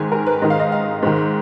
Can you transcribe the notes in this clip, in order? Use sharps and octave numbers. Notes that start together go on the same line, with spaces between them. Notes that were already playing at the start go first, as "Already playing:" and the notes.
Already playing: G#2 D#3 G#5
A#4
B4
G#2 D#3 D#5
F5
D#5
F5
G#2 D#3